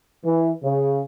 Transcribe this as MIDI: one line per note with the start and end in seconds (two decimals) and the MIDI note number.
0.25 0.50 52
0.63 1.01 49